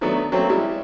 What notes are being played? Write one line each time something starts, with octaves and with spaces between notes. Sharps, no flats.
D#3 F#3 A3 B3 D4
F#3 A3 A#3 C4 C#4
G3 G#3 E4